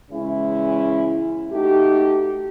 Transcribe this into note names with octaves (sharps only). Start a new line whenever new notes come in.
E2 C#3 G#3 C#4 E4
A3 D#4 F#4 G4